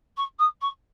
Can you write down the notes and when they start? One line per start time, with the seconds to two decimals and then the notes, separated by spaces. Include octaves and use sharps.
0.17 C#6
0.39 D#6
0.61 C#6